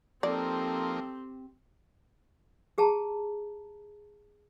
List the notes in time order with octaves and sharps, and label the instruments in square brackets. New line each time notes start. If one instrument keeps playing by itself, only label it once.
[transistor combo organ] F3 A#3 D#4 [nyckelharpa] C4 G4 [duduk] A4 [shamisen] D5
[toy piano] G4 G#4 A5 A#5